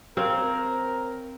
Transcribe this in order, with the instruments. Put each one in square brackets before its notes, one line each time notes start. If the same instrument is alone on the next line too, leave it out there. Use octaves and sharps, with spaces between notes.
[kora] C4 C#5 F5 [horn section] A#4